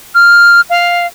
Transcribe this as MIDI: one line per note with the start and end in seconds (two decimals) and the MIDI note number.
0.15 0.61 89
0.70 1.07 77